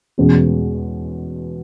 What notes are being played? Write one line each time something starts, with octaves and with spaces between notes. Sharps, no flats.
E2 B2 G#3 C#4